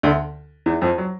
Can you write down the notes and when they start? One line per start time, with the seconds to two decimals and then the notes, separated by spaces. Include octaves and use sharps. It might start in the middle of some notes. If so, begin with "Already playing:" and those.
0.03 D2 D3
0.66 E2 E3
0.81 F2 F3
0.98 F#3